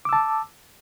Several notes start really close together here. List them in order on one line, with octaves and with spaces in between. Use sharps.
D6 E6 A5